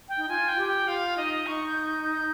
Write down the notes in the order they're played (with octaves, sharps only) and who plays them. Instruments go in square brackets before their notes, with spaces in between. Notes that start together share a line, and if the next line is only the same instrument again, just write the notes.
[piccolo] G5
[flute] D#4
[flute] F4 [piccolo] G#5
[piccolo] G5
[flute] G4
[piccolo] G5
[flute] F4 [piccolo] F5
[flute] D#4 [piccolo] D#5
[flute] D#4 [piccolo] C#6
[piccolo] G6
G6